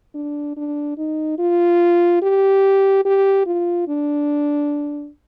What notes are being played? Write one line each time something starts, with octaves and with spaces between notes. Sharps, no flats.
D4
D4
D#4
F4
G4
G4
F4
D4